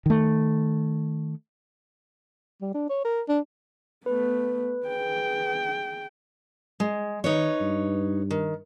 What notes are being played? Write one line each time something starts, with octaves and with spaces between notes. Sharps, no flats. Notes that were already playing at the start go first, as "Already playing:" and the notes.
D#3 A3
G3
D4
C#5
A#4
D4
A3 B3 B4
G#4 G5
G#3
D#3 D#4 B4 C#5
G2
D#3